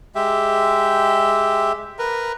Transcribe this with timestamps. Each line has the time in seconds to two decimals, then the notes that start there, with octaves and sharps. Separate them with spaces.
0.15 G#3 G4 E5
1.99 A#4 B4